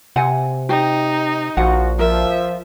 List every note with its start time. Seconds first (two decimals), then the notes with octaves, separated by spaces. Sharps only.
0.16 C3 F#5 G#5
0.69 D#4 G4
1.57 A#1 F3 F#4 F#5
1.99 F3 A#4 E5